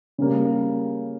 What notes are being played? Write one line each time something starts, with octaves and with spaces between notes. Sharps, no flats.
C#3 G3 A#3